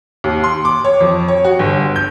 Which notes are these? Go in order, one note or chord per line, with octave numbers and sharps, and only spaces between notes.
D#2
C6
D6
C#5
F2
C#5
F#4
G1
G6